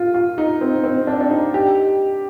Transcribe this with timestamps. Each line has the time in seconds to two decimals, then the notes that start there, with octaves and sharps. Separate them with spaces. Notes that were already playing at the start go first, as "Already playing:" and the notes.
Already playing: F4
0.14 F4
0.38 D#4
0.61 C4
0.84 C4
1.07 D4
1.21 D4
1.31 D#4
1.54 G4